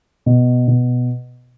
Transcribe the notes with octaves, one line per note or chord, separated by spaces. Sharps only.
B2
B2